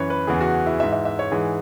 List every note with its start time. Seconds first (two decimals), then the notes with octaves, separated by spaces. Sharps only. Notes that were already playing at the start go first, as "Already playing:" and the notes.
Already playing: F#2 E3 B4 C#5
0.10 B4
0.27 E2 C#3 E3 G#4
0.41 F#4
0.66 E4
0.80 G#2 E3 E5
0.92 E5
1.05 E5
1.19 C#5
1.31 G#2 E3 G#4